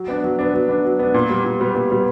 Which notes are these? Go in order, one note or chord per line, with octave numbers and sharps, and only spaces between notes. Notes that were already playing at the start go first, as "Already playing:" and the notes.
Already playing: F#3
B3 D4
F#3
B3 D4
F#3
B3 D4
F#3
B3 D4
A#2
G3 B3
A#2
G3 B3
A#2
G3 B3